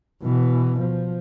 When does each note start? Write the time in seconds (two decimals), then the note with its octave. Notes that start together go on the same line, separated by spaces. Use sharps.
0.23 B2 E3
0.80 F3